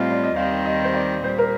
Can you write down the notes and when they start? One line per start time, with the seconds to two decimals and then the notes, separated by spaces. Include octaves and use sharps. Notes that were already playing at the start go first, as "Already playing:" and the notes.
Already playing: A2 G3 C4 F4 C5 D#5 F5
0.11 D5
0.23 D#5
0.36 D#2 D#3 G3 C4 F5
0.66 D#5
0.84 C5
0.94 D5
1.24 A#2 G3 C5
1.38 A#4